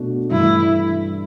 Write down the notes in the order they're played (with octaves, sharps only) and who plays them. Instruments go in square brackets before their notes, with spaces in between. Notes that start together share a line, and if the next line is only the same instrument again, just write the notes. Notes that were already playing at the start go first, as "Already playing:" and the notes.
Already playing: [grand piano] B2 A3 D4 F#4
[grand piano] G2 E3 A3 D4 [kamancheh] E4